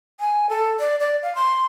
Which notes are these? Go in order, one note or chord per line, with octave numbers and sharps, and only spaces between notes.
G#5
A4
D5
D5
F5
C6